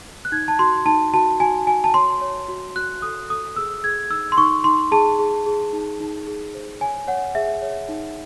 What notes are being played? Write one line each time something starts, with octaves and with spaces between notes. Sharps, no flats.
F#6
D#4 G#6
A5
F#4 C6
D#4 A5
F#4 A5
F#4 G#5
F#4 G#5
A5
C#5 C6
C#5
F#4
F#4 F#6
A4 D#6
A4 D#6
G#4 E6
G#4 G#6
D#4 E6
C6
D#4 C#6
D#4 C6
G#4 A5
G#4
G#4
D#4
D#4
G#4
C5
C#5 G#5
C#5 F#5
G#4 E5
C#5
D#4